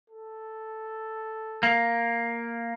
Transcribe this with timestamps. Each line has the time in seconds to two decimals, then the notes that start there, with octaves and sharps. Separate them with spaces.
0.10 A4
1.63 A#3